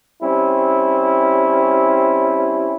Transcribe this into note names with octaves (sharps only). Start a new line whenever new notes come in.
G3 C4 C#4 E4